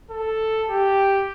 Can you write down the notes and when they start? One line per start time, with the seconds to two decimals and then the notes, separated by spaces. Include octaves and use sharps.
0.10 A4
0.70 G4